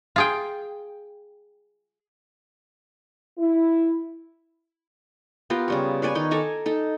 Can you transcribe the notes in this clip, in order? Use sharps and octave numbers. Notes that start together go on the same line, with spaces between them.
F4 G#4 G5
E4
B3 F4 G4 A#4
C#3 G3 C#5
B4 C#5 D5 G#5
D#3 D#4 C#5
A4 G#5 A#5 D6
D#4 A4